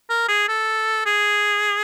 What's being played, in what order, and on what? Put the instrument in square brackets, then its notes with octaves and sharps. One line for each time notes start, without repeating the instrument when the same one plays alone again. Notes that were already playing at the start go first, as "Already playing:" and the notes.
[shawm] A#4
G#4
A4
G#4